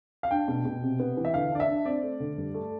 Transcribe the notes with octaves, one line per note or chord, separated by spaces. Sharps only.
F5
D4 G5
B2
B2
C3
B3
E3
E5
D3 F5
D4 D5
E5
D4
C4 D5
A3
D3
G2
A3